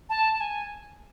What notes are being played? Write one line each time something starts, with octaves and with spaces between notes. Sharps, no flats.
A5
A5
G#5